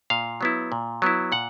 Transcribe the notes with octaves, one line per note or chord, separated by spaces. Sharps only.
A#2 F5
F#3 B3 E4
A#2
F#3 B3 E4
A#2 F#5